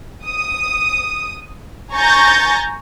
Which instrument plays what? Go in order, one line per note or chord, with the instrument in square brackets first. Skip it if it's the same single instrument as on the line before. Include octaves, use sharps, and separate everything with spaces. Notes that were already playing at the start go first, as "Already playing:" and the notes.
[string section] D#6
G#5 A#5 C#6 G6 A6 A#6